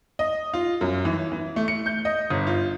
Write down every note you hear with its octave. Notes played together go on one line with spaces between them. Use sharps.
D#5
F4
F#2
E3
E3
A3
C#7
G6
D#5
G1
F4